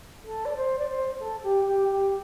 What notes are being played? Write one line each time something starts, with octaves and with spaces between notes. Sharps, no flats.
A4
D5
C5
D5
C5
A4
G4
G4
G4